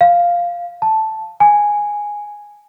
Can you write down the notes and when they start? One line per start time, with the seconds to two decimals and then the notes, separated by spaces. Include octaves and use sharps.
0.01 F5
0.82 A5
1.40 G#5